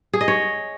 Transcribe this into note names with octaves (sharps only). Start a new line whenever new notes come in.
G#4
D#5
C#5